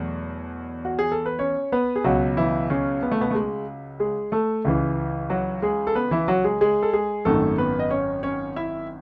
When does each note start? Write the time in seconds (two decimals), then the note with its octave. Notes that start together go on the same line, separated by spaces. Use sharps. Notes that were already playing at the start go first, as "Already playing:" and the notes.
Already playing: E2 B2 F#3 A3
0.85 F#4
0.99 G#4
1.12 A4
1.26 B4
1.39 C#4 C#5
1.72 B3 B4
1.96 G#4
2.04 C#2 B2 F#3 F#4
2.37 E3 E4
2.70 C#3 C#4
3.02 B3
3.11 A3
3.20 B2 B3
3.30 A3
3.35 G#3
4.00 G#3 G#4
4.32 A3 A4
4.65 C#2 C#3 E3
5.30 F#3 F#4
5.62 G#3 G#4
5.87 A4
5.95 B3 B4
6.11 E3 E4
6.28 F#3 F#4
6.44 G#3 G#4
6.61 G#3 G#4
6.83 A4
6.93 G#3 G#4
7.25 G#1 F#2 D#3 A3 A4
7.58 B3 B4
7.79 D#5
7.91 C#4 C#5
8.23 C#4 C#5
8.56 E4 E5